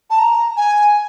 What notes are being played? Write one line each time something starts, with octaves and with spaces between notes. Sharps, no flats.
A5
A#5
G#5